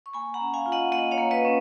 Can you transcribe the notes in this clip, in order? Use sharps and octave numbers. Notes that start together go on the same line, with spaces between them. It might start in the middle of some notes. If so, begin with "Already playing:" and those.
C#6
A#3 G#5 B5
F#5 A#5
C#4
F5 G#5
F4
D#5 F#5
A#3 D#5 F#5
C#5 F5
A#3
B4 D#5
C#4